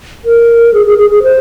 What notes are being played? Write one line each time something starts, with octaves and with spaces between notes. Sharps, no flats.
A#4
G#4
G#4
G#4
G#4
C5